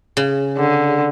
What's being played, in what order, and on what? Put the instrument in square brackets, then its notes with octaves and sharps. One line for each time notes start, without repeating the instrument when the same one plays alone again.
[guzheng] C#3
[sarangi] D3